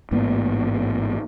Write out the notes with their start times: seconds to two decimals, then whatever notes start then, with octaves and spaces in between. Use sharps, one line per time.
0.11 A1 G#2 A#3 B3